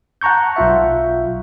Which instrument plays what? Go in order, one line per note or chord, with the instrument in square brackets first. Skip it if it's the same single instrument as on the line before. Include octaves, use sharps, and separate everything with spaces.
[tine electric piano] F#5 A5 A#5 C#6 G6
B1 F4 E5